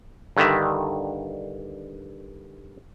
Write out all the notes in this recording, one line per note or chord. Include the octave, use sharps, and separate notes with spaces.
G2 D3 D#3 E5